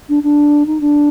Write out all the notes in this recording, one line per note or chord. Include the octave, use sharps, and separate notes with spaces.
D4
D4
D#4
D4